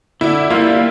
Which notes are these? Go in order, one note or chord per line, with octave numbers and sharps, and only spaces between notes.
D3 E4
G3 A#3 F4